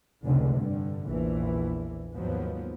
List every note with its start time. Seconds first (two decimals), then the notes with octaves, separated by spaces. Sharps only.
0.25 F1 C#2 D3
0.57 G2 D3
1.07 A#1 E2 E3
2.13 D#2 G#2 F3 F#3 B3